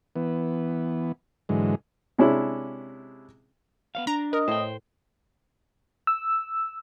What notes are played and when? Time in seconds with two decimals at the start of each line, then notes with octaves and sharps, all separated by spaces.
0.16 E3 B3
1.49 G#2 D3 E3 F#3 G#3
2.18 C3 G#3 C#4 D4 E4
3.95 B3 C#5 F5
4.07 D4 A#5
4.33 A#4 D#5
4.48 A2 C5 G5
6.07 E6